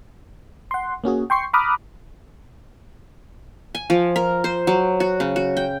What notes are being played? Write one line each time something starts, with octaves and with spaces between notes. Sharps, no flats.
F#5 C6
A#3 C#4 F#4 G#4
G5 C6 C#6 C7
A#5 B5 D6 D#6 F6 F#6
G#5
F3
A#4
C5
F#3
F#4
C#3
F#4
G5